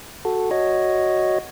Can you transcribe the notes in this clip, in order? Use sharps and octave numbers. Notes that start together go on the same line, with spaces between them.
F#4 A4
F#4 C#5 D#5